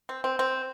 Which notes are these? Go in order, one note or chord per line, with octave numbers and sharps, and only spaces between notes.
C4
C4
C4